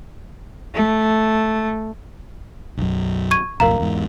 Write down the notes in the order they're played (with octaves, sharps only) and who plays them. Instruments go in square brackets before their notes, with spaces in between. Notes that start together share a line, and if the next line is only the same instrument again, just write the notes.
[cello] A3
[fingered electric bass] B1 F#2
[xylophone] C#6 G#6 D#7
[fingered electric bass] B1 F2 A2 [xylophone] A#4 F5 A#5
[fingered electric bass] E2 G#2